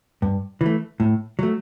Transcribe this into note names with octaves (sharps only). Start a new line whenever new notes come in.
G2
E3 A3
A2
F#3 A3